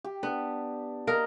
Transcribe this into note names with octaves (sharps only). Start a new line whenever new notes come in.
G4
B3 D4
A#3 A#4 D#5 A5